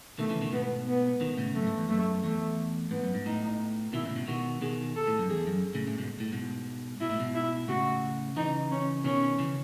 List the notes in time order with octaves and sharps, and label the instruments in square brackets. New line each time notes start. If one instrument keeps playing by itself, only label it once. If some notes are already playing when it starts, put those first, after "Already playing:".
[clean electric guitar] B2 D#3 [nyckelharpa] A3
[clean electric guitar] C#3 E3
B2 D#3
[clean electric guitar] G#2 B2 [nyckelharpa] B3
[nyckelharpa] B3
[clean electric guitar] B2 D#3
A2 C#3
[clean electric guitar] F#2 [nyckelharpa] A3
[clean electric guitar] G#2
E2
[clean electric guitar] F#2 [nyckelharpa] A3
[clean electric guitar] E2 [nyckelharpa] A3
[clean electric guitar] G#2 [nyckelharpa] B3
[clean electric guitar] F#2
G#2
[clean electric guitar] A2 [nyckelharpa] D#4
[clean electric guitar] B2 D#3 [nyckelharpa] E4
[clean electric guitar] A2 C#3
G#2 B2
[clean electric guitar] B2 D#3 [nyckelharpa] F#4
[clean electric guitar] B2 D#3 [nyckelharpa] G#4
[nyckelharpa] A4
[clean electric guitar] A2
F#2
[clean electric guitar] E2 [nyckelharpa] G#4
[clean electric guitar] F#2
A2 C#3
A2 C#3
G#2 B2
A2
G#2 B2
[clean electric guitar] B2 [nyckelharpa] E4
[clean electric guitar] A2
G#2 B2
[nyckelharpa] E4
[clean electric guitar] A2 C#3 [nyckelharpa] F#4
[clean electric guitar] C#3 E3 [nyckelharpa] D#4
[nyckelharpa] C#4
[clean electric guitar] B2 D#3 [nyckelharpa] C#4
[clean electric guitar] C#3 E3